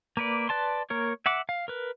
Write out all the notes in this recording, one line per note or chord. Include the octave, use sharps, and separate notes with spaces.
A#3 B4 D5
B4 D5 A5 C6
A#3 A#4 C#5
E5 F#5 D6
F5
A#4 B4